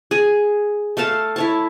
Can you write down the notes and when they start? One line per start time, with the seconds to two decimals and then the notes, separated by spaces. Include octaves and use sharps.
0.11 G#4
0.97 A3 A4 F5 A5
1.36 E4 C#5 A5